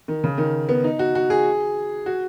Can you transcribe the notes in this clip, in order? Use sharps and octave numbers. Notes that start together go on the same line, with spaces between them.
D#3
C#3
D#3
B3
D#4
F#4
F#4
G#4
F#4